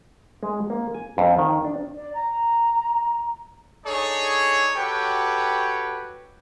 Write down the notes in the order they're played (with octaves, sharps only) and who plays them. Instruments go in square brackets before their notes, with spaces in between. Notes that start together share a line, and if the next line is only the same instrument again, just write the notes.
[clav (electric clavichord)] G#3
A#3
G#5
F2
D#3
D4
[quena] D5
A#5
[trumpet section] D4 D#4 G#4 A4 C#5
F#4 G4 A4 B4 C#5 G5